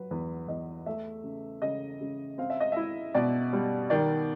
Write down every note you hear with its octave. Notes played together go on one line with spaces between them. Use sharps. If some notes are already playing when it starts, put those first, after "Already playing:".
Already playing: F#3 B4
E2 B4
E2 D#5
A3 E5
C#3
C#3 D#5
C#3
C4 F5
E5
D#5
E4 E5
B2 D5
G3
D#3 D5